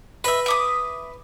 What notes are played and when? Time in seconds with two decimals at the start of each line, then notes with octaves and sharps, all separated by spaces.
0.24 B4 D#5 E5 B5
0.46 E5 D6 D#6